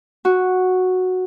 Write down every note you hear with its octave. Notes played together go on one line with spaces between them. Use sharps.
F#4